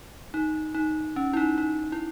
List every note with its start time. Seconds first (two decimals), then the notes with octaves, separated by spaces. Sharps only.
0.34 D#4
0.74 D#4
1.16 C#4
1.33 E4
1.37 D#4
1.58 D#4
1.92 E4